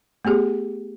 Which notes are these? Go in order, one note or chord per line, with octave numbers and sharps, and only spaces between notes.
A3 B3 G4 G#4